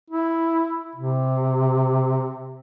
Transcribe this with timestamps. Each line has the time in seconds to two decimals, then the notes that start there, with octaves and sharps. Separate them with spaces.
0.10 E4
0.95 C3